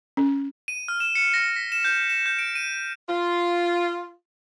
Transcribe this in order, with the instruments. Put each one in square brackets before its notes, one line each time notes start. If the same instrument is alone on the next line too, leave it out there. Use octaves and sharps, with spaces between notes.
[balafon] C#4
[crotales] D#7
F6
E7
C#7
A#6
B6
E7
G6
E7
G6
D7
D#7
[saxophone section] F4